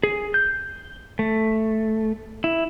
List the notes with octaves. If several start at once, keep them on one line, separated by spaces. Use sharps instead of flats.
G#4
G6
A3
E4